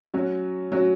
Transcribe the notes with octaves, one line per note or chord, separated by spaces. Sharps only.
F#3 C#4 F#4
F#3 C#4 F#4